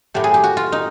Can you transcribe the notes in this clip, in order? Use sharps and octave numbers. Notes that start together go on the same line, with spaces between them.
A2 F#3 A3 G4
G#4
G4
F#4
F4
D#4